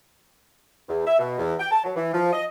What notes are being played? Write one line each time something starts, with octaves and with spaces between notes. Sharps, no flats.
E2
E5
B2
E2
G5
A5
F#3
E3
F3
D#5